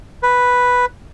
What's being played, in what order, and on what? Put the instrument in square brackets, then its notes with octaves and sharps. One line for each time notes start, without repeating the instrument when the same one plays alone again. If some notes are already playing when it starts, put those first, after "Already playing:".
[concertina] B4